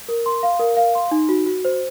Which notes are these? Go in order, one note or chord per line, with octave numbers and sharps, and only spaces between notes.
A#4
C6
F5
A#4
F5
C6
D#4
F#4
F#4
C5